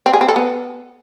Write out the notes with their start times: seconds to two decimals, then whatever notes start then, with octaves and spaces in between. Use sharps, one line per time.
0.06 C4
0.13 G#4
0.21 C4
0.28 A4
0.36 B3